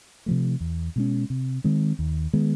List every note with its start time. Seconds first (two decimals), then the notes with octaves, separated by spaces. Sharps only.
0.26 C3 F3 A3
0.60 E2
0.96 B2 G#3 C#4
1.30 C3
1.64 D#3 G#3 C4
1.99 D#2
2.33 D#3 G#3 B3